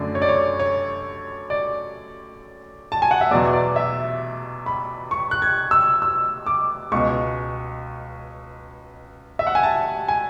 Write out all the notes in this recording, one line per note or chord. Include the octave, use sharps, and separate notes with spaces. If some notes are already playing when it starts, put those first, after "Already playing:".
Already playing: F#2 D3 A3 D5
C#5
D5
C#5
C#5
D5
A5
G#5
F#5
E5
E2 B2 F#3 D5
D5
E5
B5
C#6
F#6
G#6
E6
E6
D6
C#2 B2 G#3 C#6
E5
F#5
G#5
A5
G#5